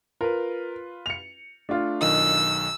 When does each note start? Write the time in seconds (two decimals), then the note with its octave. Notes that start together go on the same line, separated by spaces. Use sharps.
0.21 F4 A#4 B4
1.06 C#7 F7
1.69 A3 D4 F4
2.01 B1 D#3 D#5 E6